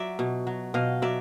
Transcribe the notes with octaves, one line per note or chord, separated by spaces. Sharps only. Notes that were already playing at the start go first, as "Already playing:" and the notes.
Already playing: F#3 D5 E5
B2
F#3
B2 D#5 F5
F#3 D5 E5